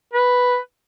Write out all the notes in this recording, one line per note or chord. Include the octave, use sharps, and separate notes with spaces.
B4